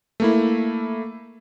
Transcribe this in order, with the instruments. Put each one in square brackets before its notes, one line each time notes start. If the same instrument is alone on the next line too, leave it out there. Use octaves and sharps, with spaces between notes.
[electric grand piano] A3 A#3 E4